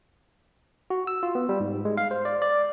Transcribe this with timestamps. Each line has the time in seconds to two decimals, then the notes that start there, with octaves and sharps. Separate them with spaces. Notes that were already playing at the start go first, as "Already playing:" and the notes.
0.90 F#4
1.07 E6
1.23 F4
1.35 B3
1.49 G3
1.60 G#2
1.85 G#3
1.97 F5
2.11 C5
2.25 D5
2.42 D5